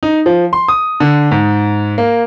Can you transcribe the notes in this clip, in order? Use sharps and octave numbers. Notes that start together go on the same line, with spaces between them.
D#4
F3
C6
D#6
D3
G#2
A#3